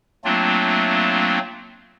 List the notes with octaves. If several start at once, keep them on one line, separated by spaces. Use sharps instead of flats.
F#3 A3 A#3 C4 D4 F4